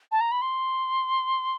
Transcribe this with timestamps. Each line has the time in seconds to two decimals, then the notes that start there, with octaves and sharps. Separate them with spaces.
0.12 A5
0.21 A#5
0.32 B5
0.42 C6